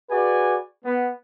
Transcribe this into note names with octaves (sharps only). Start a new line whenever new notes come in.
F#4 G#4 B4 D5 G#5
B3